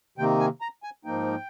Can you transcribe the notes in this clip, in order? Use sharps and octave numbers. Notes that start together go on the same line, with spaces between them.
C3 D#3 A#3 G5
G#5
A#5
G#5
G#2 F3 A#3 D#4 G5